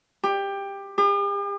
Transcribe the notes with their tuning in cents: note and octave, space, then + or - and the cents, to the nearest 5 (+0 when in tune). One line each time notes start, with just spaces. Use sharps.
G4 +15
G4 +45